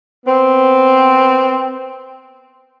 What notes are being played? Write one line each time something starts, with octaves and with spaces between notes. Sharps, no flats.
B3 C4